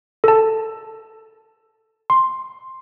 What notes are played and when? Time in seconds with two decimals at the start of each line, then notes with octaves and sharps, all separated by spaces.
0.24 A4 A5
2.10 C6